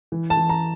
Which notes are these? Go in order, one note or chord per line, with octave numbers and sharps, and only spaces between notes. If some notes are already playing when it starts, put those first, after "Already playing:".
E3
A5
E3
A#5